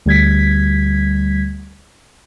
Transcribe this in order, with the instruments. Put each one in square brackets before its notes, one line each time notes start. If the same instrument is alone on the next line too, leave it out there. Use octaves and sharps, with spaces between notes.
[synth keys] D2 G3 G#6 B6